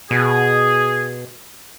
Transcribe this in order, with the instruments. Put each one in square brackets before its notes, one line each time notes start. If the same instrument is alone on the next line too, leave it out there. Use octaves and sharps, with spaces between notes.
[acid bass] B2 [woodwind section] G#4